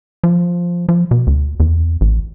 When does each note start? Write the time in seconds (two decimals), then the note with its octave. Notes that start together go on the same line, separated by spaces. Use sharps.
0.24 F3
0.89 F3
1.11 B2
1.27 D2
1.60 E2
2.01 A1